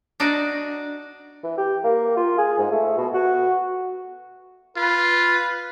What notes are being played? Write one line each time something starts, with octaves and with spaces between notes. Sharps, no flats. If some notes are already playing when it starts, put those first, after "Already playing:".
D4 D#4 F#4 D5
E3
G4
A#3
F4
G#4
G#2
A3
B2
F#4
F4 B4